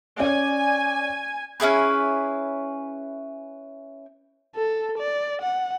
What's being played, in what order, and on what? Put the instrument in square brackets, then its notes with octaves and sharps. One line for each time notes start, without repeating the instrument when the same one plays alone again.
[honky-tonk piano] C#4 D5 [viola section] G#5
[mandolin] C#4 E4 G#4 B4
[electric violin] A4
D5
F#5